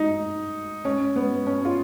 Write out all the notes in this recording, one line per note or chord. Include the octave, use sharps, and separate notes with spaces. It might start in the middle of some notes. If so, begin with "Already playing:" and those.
Already playing: D#4
C#4
B3
C#4
F4